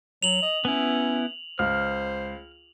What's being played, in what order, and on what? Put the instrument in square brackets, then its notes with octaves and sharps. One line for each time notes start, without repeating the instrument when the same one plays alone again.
[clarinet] F#3 [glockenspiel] F7 F#7
[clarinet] D#5
[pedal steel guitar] B3 E4 [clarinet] C#4
[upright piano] C#2 [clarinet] C5 [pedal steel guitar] F6